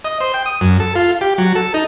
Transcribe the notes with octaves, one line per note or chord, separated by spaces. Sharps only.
D#5
C5
G5
D#6
F#2
A4
F4
G4
F#3
A4
D#4